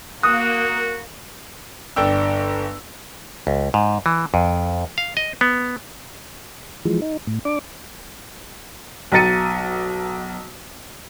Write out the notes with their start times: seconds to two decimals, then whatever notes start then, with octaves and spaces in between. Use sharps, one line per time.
0.23 A#3 F#4 D#6 F#6
1.96 G1 D4 G5 E6
3.47 C#2
3.74 G#2
4.06 E3
4.34 F2
4.98 F5
5.17 D#5
5.41 B3
6.85 E3 F3 G#3
7.02 D#4
7.27 A2
7.45 D4 D6
9.12 B1 B2 A#5 A6 C#7 D#7